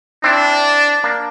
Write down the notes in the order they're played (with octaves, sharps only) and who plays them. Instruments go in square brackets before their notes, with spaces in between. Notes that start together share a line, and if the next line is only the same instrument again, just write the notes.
[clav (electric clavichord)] C4 E4 [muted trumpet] D4
[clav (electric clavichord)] A#3 D4